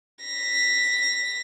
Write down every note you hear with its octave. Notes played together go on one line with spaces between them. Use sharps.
A#6 B6